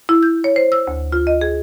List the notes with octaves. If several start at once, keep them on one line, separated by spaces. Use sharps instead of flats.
E4
G6
C#5
C5
E6
D2
F4
D#5
G#4